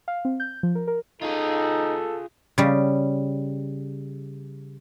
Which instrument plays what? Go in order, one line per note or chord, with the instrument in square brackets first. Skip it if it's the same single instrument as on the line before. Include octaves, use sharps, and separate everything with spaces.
[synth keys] F5
C4
G6
F3
A#4
A#4
[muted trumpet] D#4 [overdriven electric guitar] F4 G#4 [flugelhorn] A4
[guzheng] C#3 G3